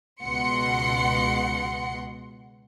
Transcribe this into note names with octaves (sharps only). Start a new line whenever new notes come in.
C#2 B2 F#5 C6 C#7